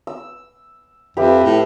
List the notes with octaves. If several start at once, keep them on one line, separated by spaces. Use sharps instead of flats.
E6
F2 G4 B4 E5
A2